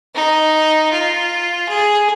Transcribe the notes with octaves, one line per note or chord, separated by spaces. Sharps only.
D#4
F4
G#4